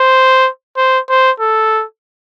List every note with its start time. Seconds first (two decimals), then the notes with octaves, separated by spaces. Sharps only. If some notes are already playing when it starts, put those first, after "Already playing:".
Already playing: C5
0.77 C5
1.09 C5
1.40 A4